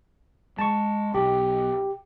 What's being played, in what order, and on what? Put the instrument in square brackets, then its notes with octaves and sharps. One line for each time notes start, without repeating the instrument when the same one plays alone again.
[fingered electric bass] G#3 [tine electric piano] A5 C#6
[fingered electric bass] B1 [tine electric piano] G4